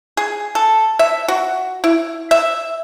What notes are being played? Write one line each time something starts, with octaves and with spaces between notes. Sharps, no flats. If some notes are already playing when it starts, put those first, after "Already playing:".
G#4
A4
E5
F#4
E4
E5